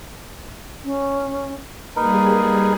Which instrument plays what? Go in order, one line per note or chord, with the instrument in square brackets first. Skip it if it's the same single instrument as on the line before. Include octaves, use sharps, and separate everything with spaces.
[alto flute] C#4
[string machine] G3 G#4 [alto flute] A#3 [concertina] D#4 A#4 B4